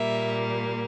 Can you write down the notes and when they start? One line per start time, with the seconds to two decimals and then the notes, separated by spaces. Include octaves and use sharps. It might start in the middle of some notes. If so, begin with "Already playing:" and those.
Already playing: A#2 G3 A#3 E5